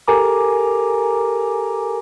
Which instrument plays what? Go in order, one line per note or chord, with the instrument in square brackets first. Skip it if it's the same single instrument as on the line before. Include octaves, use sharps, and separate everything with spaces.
[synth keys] G4 A4 A#4 G#5 A#5 D6